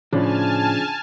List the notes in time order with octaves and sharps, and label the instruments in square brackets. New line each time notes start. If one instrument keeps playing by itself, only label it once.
[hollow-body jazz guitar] A2 [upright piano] C#3 F3 D4 [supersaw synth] G#5 A5 F6